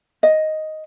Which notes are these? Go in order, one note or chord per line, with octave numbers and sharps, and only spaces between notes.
D#5